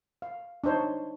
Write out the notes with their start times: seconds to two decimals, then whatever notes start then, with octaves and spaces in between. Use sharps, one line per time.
0.22 F5
0.64 D4 D#4 C5 C#5